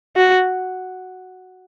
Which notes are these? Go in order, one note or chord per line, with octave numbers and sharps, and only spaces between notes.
F#4